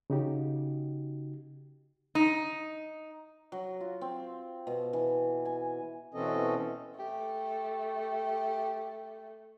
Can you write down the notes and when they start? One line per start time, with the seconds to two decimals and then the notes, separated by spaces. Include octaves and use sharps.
0.10 C#3 D#4 F#4 G4
2.15 D#4
3.52 F#3
3.81 F4
4.01 C4
4.67 B2
4.93 E3
5.45 G#5
6.14 B2 E3 C4 C#4 A4 D#5
6.99 A3 G4